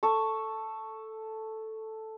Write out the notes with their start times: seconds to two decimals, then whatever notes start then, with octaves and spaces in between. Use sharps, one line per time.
0.03 A4 A5 C#6